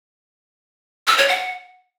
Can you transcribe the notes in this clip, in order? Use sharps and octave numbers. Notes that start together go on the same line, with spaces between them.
E6
C#5
F#5